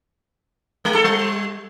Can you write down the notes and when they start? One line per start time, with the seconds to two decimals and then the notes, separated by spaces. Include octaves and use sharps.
0.85 G#3
0.95 A4
1.04 G3